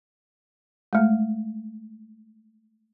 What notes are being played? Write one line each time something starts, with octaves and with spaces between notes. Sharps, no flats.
G#3 A3